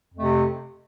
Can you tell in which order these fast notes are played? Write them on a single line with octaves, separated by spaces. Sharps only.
F2 A3 C3